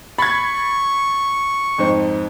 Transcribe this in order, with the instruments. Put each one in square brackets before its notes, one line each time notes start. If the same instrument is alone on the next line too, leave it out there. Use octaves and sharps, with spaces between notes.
[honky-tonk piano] B5 G#6 [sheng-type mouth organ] C#6 [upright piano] A6
[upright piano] F2 G#2 C5